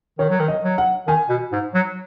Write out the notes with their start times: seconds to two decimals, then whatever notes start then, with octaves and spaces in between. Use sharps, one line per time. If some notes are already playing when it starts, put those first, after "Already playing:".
0.19 D#3 C#5
0.30 F#3
0.40 D#3
0.48 D#5
0.63 F#3
0.78 F#5
1.07 D#3 G#5
1.29 B2
1.52 G#2
1.74 F#3